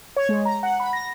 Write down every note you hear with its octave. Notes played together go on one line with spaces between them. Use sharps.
C#5
G#3
A#5
F#5
B5
A#6